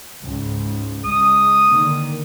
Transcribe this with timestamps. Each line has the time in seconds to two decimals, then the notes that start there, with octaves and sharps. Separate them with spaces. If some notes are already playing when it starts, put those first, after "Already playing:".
0.21 C#2 G#2
1.04 C#2 G#3 D#6
1.67 D3 D#3 A#3